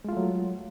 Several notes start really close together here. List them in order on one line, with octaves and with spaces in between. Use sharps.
G#3 F4 A3 F#3